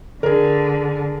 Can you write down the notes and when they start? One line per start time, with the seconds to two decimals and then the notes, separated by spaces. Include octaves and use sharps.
0.23 D3 G#4 A#4